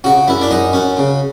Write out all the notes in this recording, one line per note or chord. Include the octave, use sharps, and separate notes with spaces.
C#3 F#4
F#2 E4
D4
F#2 D#4
F#2 C#4
C#3